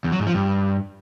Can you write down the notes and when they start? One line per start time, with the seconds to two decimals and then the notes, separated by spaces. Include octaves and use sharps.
0.04 E2
0.12 F#3
0.19 G#2
0.27 F3
0.34 G2